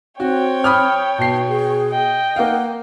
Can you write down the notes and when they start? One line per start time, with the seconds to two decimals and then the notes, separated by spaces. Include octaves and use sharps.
0.20 C4 F#4 C#5 G5
0.64 B5 D#6 F6
1.18 B2 A5 C7
1.49 G#4
1.91 D#5 G5
2.36 A#3 F5 F#5